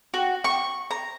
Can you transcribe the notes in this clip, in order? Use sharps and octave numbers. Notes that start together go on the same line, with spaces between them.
F#4
C#6
A#5